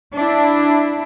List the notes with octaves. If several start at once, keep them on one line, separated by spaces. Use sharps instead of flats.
D4 E4